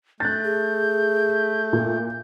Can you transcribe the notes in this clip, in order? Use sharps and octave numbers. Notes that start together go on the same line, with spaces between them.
A3 F#6 G6 A6
G#4
A#2